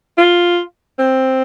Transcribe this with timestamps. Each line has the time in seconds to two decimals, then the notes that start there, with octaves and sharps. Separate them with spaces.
0.18 F4
0.99 C4